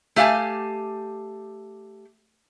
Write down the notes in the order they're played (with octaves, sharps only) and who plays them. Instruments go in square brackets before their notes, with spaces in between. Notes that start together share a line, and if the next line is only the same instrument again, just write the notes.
[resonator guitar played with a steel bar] A3 G4 F5 F#5 G#5 A5